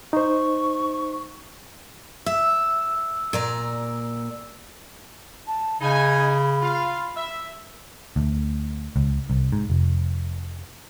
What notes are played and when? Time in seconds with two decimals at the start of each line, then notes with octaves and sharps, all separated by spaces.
0.13 D#4 C5 C#6
2.26 E5 E6
3.33 A#2 D5 A#5
5.47 A5
5.81 C#3 D#4 G#5 B5
6.62 F4 F5
7.17 E5
8.16 D2
8.96 C#2
9.30 C2
9.52 G#2
9.70 F1